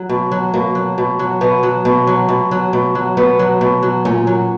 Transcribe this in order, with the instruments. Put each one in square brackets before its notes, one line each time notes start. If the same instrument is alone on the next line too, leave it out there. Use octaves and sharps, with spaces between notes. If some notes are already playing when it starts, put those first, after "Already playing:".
Already playing: [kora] F#3
B2
F#3
B2 A#3
F#3
B2
F#3
B2 B3
F#3
B2
F#3
B2
F#3
B2
F#3
B2 B3
F#3
B2
F#3
A#2 C#4
F#3